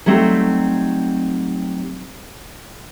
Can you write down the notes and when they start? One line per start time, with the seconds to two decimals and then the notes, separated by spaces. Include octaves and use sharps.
0.06 F#3 G3 A3 C4 D#4 G4